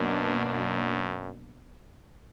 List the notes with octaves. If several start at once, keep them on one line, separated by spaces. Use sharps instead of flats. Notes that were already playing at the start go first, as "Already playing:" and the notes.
Already playing: F#2 B2 F#3 A#3 D4
F#2